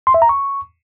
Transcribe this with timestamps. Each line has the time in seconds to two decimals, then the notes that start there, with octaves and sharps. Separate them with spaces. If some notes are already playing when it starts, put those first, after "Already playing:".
0.07 C6
0.14 E5
0.22 A#5
0.29 C#6